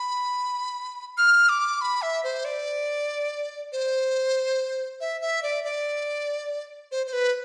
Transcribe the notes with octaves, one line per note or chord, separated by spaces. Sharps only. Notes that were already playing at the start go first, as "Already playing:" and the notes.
Already playing: B5
F6
D6
B5
E5
C5
D5
C5
E5
E5
D5
D5
C5
C5
B4